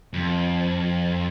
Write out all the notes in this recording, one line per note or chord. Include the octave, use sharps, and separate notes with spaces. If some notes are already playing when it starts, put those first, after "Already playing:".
F2